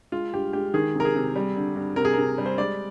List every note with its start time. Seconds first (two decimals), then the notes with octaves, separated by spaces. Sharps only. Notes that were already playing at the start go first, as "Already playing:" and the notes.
0.12 G#3 F4
0.33 G2 G4
0.53 G#3 G4
0.74 D#3 G#4
0.95 C3
1.00 A#4
1.05 G#4
1.15 C3
1.36 G3
1.56 D3
1.76 G2
1.96 C3 A#4
2.05 G#4
2.13 C3 A#4
2.38 G3
2.46 C5
2.58 G#3 D5